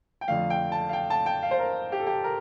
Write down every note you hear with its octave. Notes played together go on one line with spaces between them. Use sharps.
G5
F2 D3 F3 A3 F5
G5
A5
F5
G5
A5
G5
F5
C5
A#4
G4
A4
G4
A#4